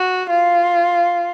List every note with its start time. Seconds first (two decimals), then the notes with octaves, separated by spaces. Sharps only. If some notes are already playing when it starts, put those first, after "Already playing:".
Already playing: F#4
0.30 F4